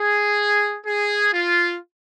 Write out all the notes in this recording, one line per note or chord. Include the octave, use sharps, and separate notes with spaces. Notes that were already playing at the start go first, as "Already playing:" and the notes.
Already playing: G#4
G#4
F4